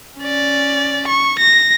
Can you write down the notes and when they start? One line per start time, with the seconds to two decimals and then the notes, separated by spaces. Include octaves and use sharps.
0.19 C#4 D5
1.07 C#6
1.39 A#6